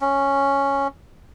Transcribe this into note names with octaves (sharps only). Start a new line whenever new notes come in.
C#4